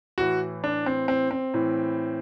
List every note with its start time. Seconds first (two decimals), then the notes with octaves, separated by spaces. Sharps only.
0.18 A2 E3 F#4
0.64 D4
0.86 C4
1.08 C4
1.31 C4
1.54 A2 E3